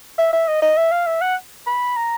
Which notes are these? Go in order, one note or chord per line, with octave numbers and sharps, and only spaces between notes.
E5
E5
D#5
D#5
E5
F5
E5
F#5
B5
A#5